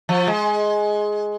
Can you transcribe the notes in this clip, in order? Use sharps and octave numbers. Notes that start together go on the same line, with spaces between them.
F3
G#3